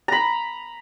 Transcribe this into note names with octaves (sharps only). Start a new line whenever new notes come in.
A#5 B5